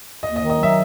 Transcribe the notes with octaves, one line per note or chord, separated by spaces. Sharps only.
D#2 D#5
D#5
D#3
D#5
F#3 E5